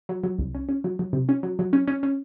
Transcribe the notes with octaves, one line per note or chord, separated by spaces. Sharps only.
F#3
F#3
C2
C#4
C#4
F#3
F#3
C3
C#4
F#3
F#3
C#4
C#4
C#4